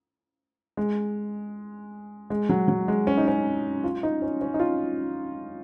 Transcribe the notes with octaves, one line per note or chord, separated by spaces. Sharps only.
G#3
G#3
F#3
F#3
G#3
C#4
D#4
C#4
F4
D#4
C#4
C#4
D#4
F4